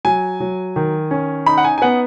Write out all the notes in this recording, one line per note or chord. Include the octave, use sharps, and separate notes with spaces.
F#3 G#5
F#3
D#3
C#4
D#4 B5
F#5
G#5
G#5
B3 F#5